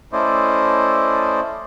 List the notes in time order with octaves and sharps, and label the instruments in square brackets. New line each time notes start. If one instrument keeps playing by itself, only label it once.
[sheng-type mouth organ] A3 C#4 E4 C5 D5 D#5